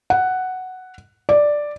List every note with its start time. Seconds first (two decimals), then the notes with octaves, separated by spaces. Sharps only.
0.10 F#5
1.29 D5